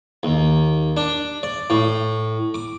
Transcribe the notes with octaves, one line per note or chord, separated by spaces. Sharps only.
D#2
D4
D5
A2
D6